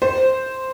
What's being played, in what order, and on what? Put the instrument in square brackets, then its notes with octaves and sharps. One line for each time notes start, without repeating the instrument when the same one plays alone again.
[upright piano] C5